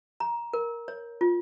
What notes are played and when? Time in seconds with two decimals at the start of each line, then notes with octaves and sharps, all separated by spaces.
0.20 A#5
0.53 A#4
0.88 C#5
1.21 F4